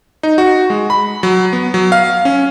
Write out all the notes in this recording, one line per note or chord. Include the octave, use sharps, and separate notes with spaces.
D#4
F#4
G#3
B5
F#3
B3
F#3
F5
C#4